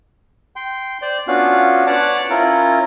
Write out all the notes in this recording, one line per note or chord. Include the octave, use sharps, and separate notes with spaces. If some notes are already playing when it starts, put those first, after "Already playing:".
G5 C6
C5 D5
B3 C#4 D4 F4 F#4 F5
B4 C#5 D5 F#5 A5 D6
C#4 E4 F4 A#4